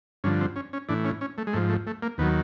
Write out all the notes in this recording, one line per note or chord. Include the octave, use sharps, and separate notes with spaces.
G2 D3 F3 C#4
C4
C#4
C#4
A2 E3 D4
C#4
C#4
A3
G#3
G#2 F3 A3
A3
A3
A#3
D#2 D#3 F#3 B3